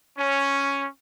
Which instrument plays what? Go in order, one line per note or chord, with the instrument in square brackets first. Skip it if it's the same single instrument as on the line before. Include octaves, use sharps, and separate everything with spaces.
[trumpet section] C#4